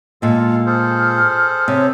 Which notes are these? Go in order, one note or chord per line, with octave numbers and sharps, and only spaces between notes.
A#2 G#3 F4 A4 F5
G#4 A4 C5 F6
C3 C#5